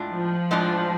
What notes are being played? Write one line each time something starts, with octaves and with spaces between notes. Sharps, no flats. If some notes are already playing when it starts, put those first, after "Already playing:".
Already playing: A2 G#3 D4 F4
F3
A2 G#3 D4 F4